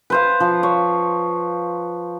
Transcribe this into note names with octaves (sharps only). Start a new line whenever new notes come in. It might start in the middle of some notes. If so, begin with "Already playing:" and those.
B4 C5 F5
F3
C#5